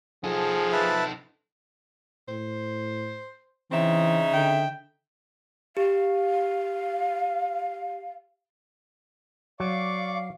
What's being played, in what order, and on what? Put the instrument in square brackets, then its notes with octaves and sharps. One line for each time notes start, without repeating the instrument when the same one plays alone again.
[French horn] F3 [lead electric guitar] D#4 A4 [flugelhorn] G#4
[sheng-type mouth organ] B4 E5 A5
[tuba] A2 [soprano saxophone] C5
[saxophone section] C#3 D#4 E5 [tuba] E3 [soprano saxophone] C4
[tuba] D3 [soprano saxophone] G5
[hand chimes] G4 [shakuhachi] F5
[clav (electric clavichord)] F#3 [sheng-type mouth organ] D5 C#6 D6 [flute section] F5